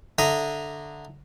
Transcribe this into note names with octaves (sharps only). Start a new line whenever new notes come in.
D3 E5 A#5 D#6